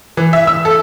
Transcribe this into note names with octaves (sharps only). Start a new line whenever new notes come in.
E3
E5
E6
A4